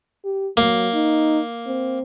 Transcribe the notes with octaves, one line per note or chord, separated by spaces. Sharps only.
G4
F#3 A#3
D#4
C4